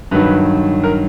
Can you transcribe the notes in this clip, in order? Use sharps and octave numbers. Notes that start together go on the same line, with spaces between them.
G2 D#3 F#3 B4
A#4